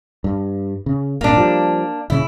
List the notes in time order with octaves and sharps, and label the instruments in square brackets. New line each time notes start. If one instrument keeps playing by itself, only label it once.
[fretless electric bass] G2
C#3
[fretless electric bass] D#1 G#1 [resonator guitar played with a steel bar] A#3 D4
[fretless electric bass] F3 G3
[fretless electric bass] D#1 C#3 [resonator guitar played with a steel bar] E4